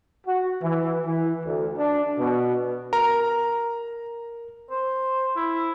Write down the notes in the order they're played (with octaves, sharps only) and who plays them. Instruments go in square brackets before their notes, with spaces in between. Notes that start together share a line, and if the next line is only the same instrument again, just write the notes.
[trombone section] F#4
E3
E3
D2
D4
B2
[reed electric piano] A#4 [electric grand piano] A#5
[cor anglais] C5
E4